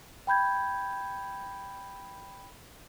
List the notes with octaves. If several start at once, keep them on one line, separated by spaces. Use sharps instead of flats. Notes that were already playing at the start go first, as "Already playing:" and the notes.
G5 B5 G6 G#6